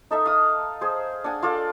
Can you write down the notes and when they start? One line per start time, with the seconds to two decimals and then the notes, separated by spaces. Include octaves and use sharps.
0.11 D#4 A4 E5
0.26 F5 D#6
0.81 G#4 C5
1.24 D4 F#5 G#5
1.42 F4 A4 D5